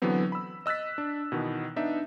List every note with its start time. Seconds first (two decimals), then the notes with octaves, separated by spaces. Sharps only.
0.02 D3 E3 F#3 B3 C4
0.32 B5 E6
0.66 D#5 E6 F#6 A6 B6
0.98 D4
1.32 B2 D#3 E3 B3
1.76 B3 D4 D#4 E5